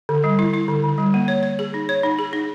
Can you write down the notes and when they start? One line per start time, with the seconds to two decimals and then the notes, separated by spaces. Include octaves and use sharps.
0.09 D3
0.24 G3
0.39 E4
0.54 E4
0.68 D3
0.84 D3
0.98 G3
1.14 A#3
1.28 C#5
1.43 C#5
1.59 G#4
1.74 D#4
1.89 C#5
2.03 D#4
2.19 G#4
2.33 D#4